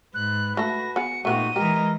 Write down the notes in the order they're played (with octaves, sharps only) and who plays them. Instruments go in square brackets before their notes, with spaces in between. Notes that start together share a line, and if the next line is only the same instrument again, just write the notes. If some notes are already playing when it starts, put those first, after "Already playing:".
[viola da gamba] G#2 [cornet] B4 [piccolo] F#6
[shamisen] A3 A4 [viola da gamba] F#4 [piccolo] A#6
[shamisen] B3 G#4 [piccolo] C#7
[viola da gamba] A#2 D#4 [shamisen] A3 B3 G4 [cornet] F#4 [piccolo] D#7
[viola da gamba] E3 G#3 D#5 [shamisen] G4 [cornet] A#4